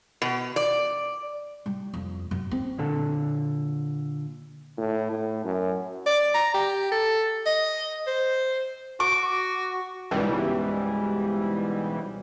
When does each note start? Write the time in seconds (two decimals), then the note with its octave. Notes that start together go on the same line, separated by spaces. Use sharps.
0.22 B2
0.56 D5
1.66 G3
1.94 F2
2.31 F#2
2.51 C4
2.79 A#2 D3 A4
4.77 A2
5.11 A2
5.45 F#2
6.06 D5
6.34 A#5
6.54 G4
6.91 A4
7.46 D#5
8.07 C5
9.00 F#4 D6
10.11 C#2 G#2 B2 E3 G3